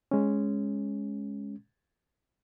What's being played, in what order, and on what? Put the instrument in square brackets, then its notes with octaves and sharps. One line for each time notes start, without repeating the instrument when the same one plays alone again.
[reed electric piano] G#3 C#4